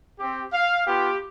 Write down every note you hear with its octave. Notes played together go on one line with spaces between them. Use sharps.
C4 G4
F5
B3 F4 G4